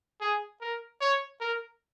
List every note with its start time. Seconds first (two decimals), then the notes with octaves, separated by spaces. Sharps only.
0.21 G#4
0.61 A#4
1.01 C#5
1.41 A#4